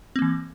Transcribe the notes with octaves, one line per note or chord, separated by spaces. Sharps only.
E3 A#3 C4